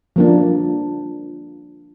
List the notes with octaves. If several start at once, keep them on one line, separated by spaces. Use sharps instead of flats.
F3 A#3 D4